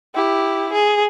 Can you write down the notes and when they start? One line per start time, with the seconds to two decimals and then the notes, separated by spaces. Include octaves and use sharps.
0.15 E4 G4
0.73 G#4